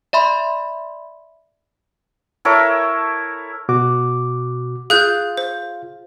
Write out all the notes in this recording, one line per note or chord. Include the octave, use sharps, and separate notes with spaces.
D5 E5 B5 C6
E4 A4 A#4 C#5
B2 F#4 D6
F4 G#4 F5 F#6 G6
C5